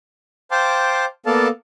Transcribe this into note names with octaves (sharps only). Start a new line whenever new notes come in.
C5 F5 G5 A5 C6 D6
A#3 B3 A4 D5 F5 A5